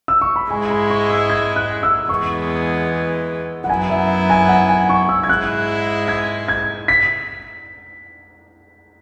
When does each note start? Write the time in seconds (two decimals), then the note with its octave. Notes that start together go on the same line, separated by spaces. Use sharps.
0.08 E6
0.21 C#6
0.36 B5
0.50 G#2 G#3 E4 G#5
0.70 B5
0.90 C#6
1.10 E6
1.30 G#6
1.56 F#6
1.83 E6
2.09 E2 E3 G#3 B3 C#6
3.64 F#5
3.69 F#2 F#3 B3 E4 G#5
3.90 E5
4.30 G#5
4.48 F#5
4.69 G#5
4.89 C#6
5.09 E6
5.23 G#6
5.29 G#2 G#3 E4 F#6
6.08 G#6
6.48 G#6
6.88 B6